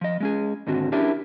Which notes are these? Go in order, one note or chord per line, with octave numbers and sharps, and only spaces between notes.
F3 D#5
G#3 C#4 G#4
D#2 G#2 D3 C4 F#4
C#4 D4 E4 G4 A#4